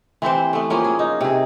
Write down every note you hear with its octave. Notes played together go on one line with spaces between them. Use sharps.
E3 C4 G4 C5
A3 B3
F3 A#3 C#4
G#4
D#4
C3 G#4